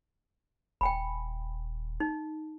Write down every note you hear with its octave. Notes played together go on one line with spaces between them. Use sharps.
D#1 G5 G#5 B5
D#4